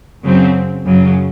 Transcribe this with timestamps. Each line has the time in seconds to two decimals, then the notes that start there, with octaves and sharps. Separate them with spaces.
0.21 F#2 C#3 F#3 C4
0.85 F#2 C#3 F#3